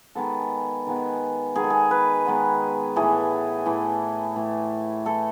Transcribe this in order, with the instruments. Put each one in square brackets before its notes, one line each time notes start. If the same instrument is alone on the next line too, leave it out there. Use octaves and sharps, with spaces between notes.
[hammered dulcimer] D#3 G#3 B3 A4
D#3 G#3 B3
D#3 G#3 B3 G#4
A4
G#4
B4
D#3 G#3 B3
A2 E3 A3 G#4
A2 E3 A3
A2 E3 A3
A2 E3 A3 A4